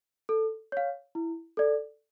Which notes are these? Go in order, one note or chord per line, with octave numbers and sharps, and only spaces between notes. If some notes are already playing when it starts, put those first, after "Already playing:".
A4
C#5 F5
E4
A4 D5